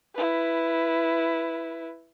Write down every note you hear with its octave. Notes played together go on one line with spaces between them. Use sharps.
E4 B4